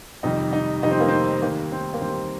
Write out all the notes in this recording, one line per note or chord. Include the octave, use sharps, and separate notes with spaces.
F2 C3 D#3 G3 D#4
D#4
F2 C3 D#3 G3 D#4
C4
A#3
C4
D#2 D#3 G3 A#3
C4
A#3
D#2 D#3 G3 C4